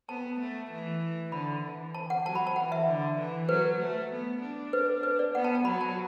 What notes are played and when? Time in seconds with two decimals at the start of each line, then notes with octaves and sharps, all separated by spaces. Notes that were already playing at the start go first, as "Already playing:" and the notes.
0.09 B3 A5
0.40 A3
0.72 E3
1.32 D3 B5
1.63 E3
1.95 A5
2.10 F#5
2.25 F#3 A5
2.35 B5
2.47 A5
2.56 E3 F#5
2.72 E5
2.88 D3
3.18 E3
3.49 F#3 B4
3.80 A3
4.12 B3
4.42 D4
4.73 B4
5.03 B4
5.19 D5
5.34 B3 F#5
5.44 A5
5.55 A5
5.65 F#3 B5
5.81 A5